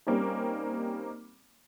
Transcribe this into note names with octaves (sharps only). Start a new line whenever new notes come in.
G3 A#3 C4 C#4 D#4